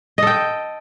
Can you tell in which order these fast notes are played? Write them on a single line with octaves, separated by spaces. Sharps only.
D#5 A4 G5